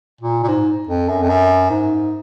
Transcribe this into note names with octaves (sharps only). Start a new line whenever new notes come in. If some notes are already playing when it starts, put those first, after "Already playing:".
A#2
A#2
G#2
F2
F#2
F2
F#2
G#2